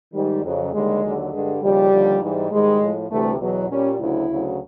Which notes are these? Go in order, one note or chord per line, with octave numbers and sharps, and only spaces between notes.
G#2 D#3 G3
F2 C#3 F#3
D#2 D3 G3 G#3
D#2 D3 F#3
G2 D3 G3 G#3
D#2 C#3 F3 G3
D#2 D3 F3
G#2 E3 G3
G#2 D#3 G3 G#3
A2 F3
D2 C3 E3 G3 A3
E2 B2 F#3
A#2 G3 C#4
D2 C#3 F#3 E4
D2 C#3 F#3